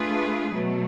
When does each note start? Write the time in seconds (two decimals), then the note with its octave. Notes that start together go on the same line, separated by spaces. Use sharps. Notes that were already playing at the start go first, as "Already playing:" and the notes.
Already playing: A3 D4 F4 G#4 B4
0.53 B2 F#3 A3